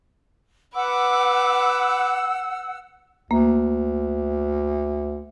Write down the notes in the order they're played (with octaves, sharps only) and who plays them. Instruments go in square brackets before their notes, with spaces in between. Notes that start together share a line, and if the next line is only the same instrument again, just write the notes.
[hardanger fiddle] B4 D6 [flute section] F#5 E6
[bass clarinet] D2 [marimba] A#3